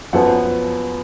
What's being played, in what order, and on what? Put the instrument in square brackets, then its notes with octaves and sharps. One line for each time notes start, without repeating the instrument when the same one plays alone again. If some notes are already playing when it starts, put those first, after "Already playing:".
[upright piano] F#2 F3 B3 F#5